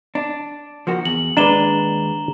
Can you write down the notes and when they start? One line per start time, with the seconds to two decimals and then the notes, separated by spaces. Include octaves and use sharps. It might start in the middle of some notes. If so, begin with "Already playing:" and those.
0.15 D4
0.87 F3 A#3 F#4
1.05 E2 F#7
1.37 D#2 G#3 D4 B4 A#5 E7 G7